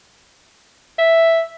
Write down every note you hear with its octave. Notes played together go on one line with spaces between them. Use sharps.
E5